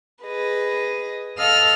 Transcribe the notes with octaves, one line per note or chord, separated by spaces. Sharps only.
G#4 B4 D#5
A4 D#5 F5 E6 F6